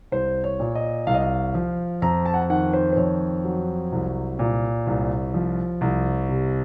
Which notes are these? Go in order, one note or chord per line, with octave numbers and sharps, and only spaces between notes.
C2 C5
C#5
A#2
D#5
C2 F5
D#5
F5
F3
F2 A#5
A5
F#5
A5
D#3 F#5
C5
C5
F2 C#5
F#3
C2
A#2
C2
F3
C2
C3